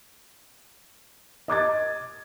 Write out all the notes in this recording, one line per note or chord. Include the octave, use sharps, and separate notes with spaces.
D#5 D6 G#6 A6